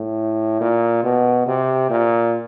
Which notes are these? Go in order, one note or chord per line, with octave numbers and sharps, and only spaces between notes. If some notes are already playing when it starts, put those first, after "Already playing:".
Already playing: A2
A#2
B2
C3
A#2